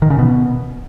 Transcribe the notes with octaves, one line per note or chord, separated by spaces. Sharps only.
D#3
C#3
B2